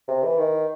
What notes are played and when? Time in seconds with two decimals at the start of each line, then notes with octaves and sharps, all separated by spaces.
0.08 C3
0.23 E3
0.38 D#3